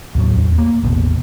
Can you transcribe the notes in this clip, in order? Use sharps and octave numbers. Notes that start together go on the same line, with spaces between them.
D#2 A2 F#3
E2
A#3
A1 E2 B2